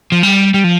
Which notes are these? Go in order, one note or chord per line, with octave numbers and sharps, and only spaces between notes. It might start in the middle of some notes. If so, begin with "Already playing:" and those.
F3
G3
G3
F3